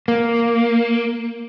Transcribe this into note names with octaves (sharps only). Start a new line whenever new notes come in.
A#3